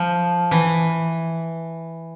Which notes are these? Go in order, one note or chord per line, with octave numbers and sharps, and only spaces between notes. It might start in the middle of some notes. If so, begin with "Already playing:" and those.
Already playing: F3
E3